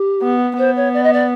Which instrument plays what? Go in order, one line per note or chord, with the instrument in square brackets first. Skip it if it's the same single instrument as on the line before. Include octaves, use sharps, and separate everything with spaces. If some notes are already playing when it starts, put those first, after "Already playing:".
Already playing: [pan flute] G4
[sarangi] B3
[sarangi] B3 [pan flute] C5
[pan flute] C#5
D5
D#5
D5